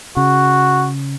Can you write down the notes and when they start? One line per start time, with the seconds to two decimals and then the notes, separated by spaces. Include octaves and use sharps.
0.17 C#3 F#4